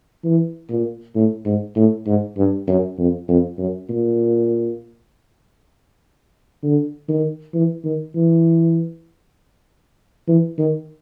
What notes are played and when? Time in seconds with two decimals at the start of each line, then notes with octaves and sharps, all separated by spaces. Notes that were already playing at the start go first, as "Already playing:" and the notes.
0.24 E3
0.70 A#2
1.15 A2
1.46 G#2
1.76 A2
2.07 G#2
2.37 G2
2.67 F#2
2.98 F2
3.28 F2
3.58 F#2
3.89 A#2
6.63 D3
7.09 D#3
7.54 E3
7.84 D#3
8.15 E3
10.28 E3
10.58 D#3